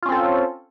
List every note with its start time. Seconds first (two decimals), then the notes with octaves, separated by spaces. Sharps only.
0.03 F4
0.06 C#4
0.09 C4
0.12 A4